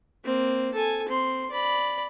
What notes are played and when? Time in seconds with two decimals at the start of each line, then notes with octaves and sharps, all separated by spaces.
0.24 A#3 C4
0.73 A4 G#5
1.09 C4 C6
1.51 D5 B5